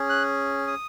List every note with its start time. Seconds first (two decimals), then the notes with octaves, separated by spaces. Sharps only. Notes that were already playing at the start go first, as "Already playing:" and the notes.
Already playing: C#4 G#4
0.09 F#6
0.67 D#6